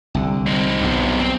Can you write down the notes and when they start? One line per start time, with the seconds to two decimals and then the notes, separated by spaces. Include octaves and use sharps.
0.15 C2 D3
0.46 C4 D#4
0.81 B1 E2 G2
1.20 C4